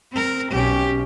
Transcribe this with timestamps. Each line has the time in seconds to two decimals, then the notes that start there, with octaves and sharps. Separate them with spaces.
0.12 C4 A#4
0.52 B1 C#4 G4